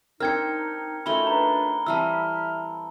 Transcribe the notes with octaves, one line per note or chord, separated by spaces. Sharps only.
C4 D4 D#4 A#4 G5 F6 G#6 C#7
A3 C#4 D#4 F4 F#4 B5 G7
D4 F4 B4 A#5
E3 G3 C4 E5 A5 E6 F6